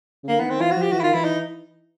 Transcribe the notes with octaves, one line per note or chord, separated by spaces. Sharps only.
C#3
D3 A#3
E3 B3
D#3 C4
E3 F4
F#4
F3
G4
E3 F#4
E4
D#3 F4
E3 E4
D#4